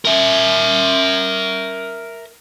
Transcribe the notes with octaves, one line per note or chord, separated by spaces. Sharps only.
A#4 E5